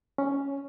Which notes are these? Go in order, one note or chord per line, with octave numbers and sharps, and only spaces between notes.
C#4